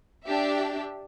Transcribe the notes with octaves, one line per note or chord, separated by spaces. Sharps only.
D4 G4 E5